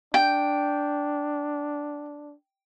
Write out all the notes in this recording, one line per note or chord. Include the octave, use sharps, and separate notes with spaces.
D4 G5